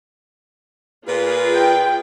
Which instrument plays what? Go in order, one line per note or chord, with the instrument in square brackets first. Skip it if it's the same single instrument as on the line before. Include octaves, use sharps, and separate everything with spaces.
[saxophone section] A#2 B4 [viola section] F4 G#4
[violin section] G5